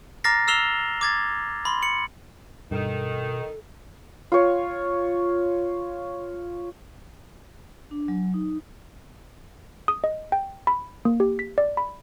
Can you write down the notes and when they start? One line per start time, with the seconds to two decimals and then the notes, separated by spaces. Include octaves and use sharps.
0.24 A#5 D6 F6 A6 A#6 C7
0.48 E6 F6 C7 E7 F7 G7
1.01 D6 G#6 A6
1.65 B5 C6
1.82 C#7 F#7
2.71 G2 B2 D#3 A4
4.32 F4 C#5
7.91 D4
8.08 F#3
8.34 D#4
9.88 D#6
10.04 D#5
10.32 G5
10.67 B5
11.05 A#3
11.20 G4
11.39 B6
11.58 D5
11.77 B5